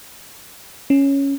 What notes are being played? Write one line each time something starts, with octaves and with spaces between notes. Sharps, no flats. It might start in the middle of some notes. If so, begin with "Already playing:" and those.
C#4